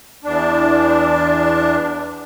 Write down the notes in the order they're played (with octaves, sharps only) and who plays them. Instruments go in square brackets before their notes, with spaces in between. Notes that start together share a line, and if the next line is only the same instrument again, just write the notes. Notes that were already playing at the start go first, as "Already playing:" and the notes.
[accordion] E2 D4